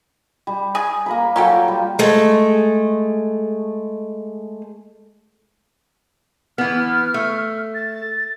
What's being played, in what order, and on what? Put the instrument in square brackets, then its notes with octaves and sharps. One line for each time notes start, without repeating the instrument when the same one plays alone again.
[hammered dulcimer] G3
[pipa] G#4
[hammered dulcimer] A#3 A#4 B5
[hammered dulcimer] F#3 F4 [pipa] C#4 A4 G5
[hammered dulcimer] G3
[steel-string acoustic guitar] G#3 A3
[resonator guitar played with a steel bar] E3 B3 [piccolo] F6
[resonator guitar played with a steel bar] A3
[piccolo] A6